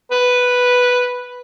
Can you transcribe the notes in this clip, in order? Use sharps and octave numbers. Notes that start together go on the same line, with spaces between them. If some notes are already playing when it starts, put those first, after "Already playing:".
B4